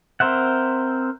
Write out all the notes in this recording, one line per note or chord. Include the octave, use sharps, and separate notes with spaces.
C4 A#4 C5 E5 F#5